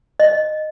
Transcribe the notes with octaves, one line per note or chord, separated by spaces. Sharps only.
D#5